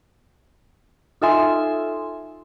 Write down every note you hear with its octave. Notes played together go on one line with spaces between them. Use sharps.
D#4 F4 A4 E5 G#5 C6